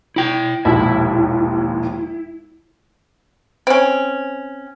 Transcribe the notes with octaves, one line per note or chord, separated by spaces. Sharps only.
E4 G5
E1 A#1 D#2 E4
C4 C#4